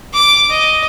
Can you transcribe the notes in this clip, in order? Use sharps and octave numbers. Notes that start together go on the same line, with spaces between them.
D6
D#5